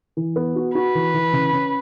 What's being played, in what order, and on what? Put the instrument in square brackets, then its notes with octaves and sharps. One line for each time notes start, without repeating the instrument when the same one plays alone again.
[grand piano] E3
B3
F#4
[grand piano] F#4 [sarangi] B4
[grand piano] E3
E3
C#3
C#4